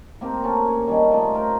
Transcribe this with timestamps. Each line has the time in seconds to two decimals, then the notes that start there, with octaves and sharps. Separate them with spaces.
0.21 A#3 C4 G4 A#4
0.42 A#3 C#4 A4 A#4
0.67 C#5
0.87 D#3 G3 C#4 A4
1.11 A3 A#3 F4 D#5
1.34 A#4 C5